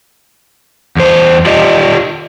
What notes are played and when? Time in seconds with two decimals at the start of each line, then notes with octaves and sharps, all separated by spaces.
0.96 E2 C5
1.46 F4 G4 D5 D#5